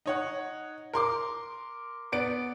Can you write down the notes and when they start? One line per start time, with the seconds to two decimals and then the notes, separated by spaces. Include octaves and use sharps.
0.06 D#4 C#5 F#5
0.93 A#4 C6 D6
2.12 B3 D5 D7